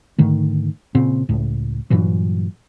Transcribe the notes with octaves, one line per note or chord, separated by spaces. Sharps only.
G#2 D3 D#3 A3
A#2 C#3 C4
C#2 A2
G2 A#2 E3 F#3